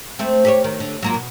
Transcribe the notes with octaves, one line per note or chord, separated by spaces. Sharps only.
A3 C4
G4 A4 C#5
D#3
D3
F#3 A#3 F4
B2